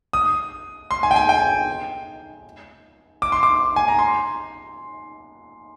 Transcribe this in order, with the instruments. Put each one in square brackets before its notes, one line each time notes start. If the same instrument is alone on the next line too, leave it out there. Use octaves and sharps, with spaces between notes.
[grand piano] D#6
C6
G#5
G5
G#5
G5
D6
C6
D6
G#5
A#5
C6